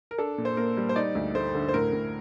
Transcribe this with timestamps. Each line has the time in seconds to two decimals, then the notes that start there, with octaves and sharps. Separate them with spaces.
0.11 A#4
0.18 D4 A4
0.38 A#2
0.45 C5
0.57 A#3 A#4
0.77 G3
0.89 C5
0.96 D#4 D5
1.15 D2
1.35 A3 C5
1.55 D3
1.68 C5
1.74 A2 A#4
1.93 A2